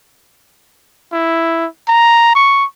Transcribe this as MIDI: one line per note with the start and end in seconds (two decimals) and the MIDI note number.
1.13 1.66 64
1.88 2.31 82
2.35 2.64 85